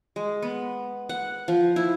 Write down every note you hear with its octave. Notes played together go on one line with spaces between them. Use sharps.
G#3
B3
F#5
F3
E4